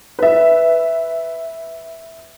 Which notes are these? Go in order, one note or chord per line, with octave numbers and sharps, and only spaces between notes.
B4 E5